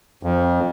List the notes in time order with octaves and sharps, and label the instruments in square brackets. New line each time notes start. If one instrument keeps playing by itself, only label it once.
[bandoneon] F2